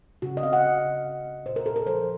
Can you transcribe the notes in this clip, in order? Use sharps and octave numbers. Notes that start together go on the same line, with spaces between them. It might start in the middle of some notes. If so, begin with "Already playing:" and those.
C#3 F#4
D#5
C4 F5
F#5
C#3
C4
C4
C4
A#2 C5
A#4
A#2 A4
A#4
F3 C5